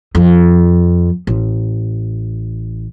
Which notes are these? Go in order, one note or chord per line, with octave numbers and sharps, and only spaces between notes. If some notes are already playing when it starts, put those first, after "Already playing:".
F2
A1